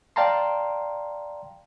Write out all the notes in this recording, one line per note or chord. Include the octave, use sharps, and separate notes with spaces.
D5 F5 G5 A5 A#5 C6